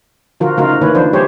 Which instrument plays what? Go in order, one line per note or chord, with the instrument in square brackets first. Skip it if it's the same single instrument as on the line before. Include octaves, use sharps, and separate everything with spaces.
[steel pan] D3 F3 F4 F#4 A#4
C#3 A3 D#4 F4 F#4 A#4
D#4
D#3 A#3 E4 B4 C#5
D#3 F3 D4 D#4 B4 C5
G3 A3 G4 G#4 C5 C#5